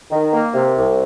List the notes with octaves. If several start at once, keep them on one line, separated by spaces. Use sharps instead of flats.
D#3
A#3
C3
C2